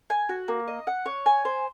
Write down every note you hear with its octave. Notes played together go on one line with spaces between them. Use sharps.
G#5
F#4
A#3
D#5
F#5
C#5
G#5
C5